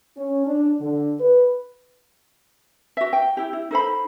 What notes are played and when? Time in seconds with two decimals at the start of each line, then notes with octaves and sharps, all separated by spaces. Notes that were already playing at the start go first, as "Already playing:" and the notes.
0.17 C#4
0.46 D4
0.80 D3
1.20 B4
2.97 F#4 E5
3.13 G5
3.37 E4 G4
3.53 E4
3.71 D#4 A4 C5 B5